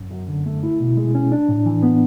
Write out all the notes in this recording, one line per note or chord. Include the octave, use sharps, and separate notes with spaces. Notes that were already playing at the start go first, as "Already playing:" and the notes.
Already playing: F#2
F#2
D3
A3
E4
B2
G#3
C#4
D4
A2
E3
B3